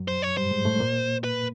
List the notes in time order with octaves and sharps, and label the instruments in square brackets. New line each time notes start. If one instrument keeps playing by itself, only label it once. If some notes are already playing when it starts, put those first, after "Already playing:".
Already playing: [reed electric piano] F#2 F#3
[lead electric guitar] C5
C#5
[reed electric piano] G2 G3 [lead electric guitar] C5
[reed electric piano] G#2 G#3
A2 A3
A#2 A#3
[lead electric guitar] B4